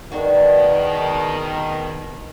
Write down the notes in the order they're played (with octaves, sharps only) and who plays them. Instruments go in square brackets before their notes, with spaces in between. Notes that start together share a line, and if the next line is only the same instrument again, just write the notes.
[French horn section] B2 D#3 [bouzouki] G#3 D4 F#4